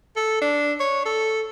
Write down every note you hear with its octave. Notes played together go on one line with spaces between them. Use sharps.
A4
D4
C#5
A4